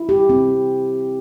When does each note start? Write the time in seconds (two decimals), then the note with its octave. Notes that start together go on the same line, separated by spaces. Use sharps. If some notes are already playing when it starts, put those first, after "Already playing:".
Already playing: E4
0.09 G4
0.30 C4